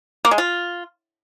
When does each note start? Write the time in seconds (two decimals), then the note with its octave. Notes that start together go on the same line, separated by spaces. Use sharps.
0.25 A#3
0.31 G#3
0.38 F4